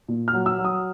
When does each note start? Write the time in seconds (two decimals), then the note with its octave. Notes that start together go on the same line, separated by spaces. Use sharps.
0.08 A#2
0.28 F6
0.33 F#3
0.46 E6
0.58 F#3
0.65 D#6